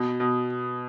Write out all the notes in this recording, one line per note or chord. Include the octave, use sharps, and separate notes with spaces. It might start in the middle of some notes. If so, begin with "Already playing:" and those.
Already playing: B2
B2